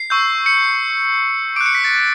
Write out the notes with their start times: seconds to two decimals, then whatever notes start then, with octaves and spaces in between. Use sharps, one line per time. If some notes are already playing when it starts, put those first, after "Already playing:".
Already playing: C7
0.10 C#6 E6 G6
0.46 C#7
1.56 D6 F#6 D7
1.66 C#7
1.75 B6
1.84 A6